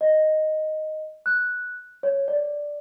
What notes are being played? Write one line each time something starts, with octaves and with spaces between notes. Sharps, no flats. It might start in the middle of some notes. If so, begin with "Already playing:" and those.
D#5
F#6
C#5
D5